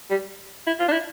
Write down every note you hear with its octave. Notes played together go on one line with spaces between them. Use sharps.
G3
E4
F4
D4
E4